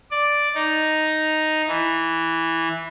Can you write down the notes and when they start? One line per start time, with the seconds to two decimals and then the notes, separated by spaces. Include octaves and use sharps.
0.11 D5
0.55 D#4
1.68 E3